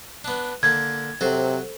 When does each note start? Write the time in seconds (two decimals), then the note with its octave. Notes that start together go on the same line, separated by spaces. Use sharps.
0.24 B3 D4
0.63 D3 A#3 G#6
1.21 C3 F#3 F#4 A4 C5